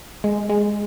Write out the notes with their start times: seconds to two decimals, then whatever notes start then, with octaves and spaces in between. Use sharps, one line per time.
0.24 G#3
0.49 G#3